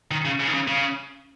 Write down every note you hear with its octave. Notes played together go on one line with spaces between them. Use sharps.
D#3
C#3
C#3
D#3
C#3
C#3